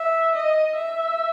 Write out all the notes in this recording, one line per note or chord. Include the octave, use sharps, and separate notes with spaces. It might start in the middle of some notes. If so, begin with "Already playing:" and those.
Already playing: E5
D#5
E5